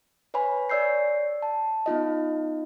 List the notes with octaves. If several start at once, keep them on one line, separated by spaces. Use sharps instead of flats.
B4 C#5 G#5 B5
C#5 D5 E6 G6 C7
A5
B3 D#4 F4 D#5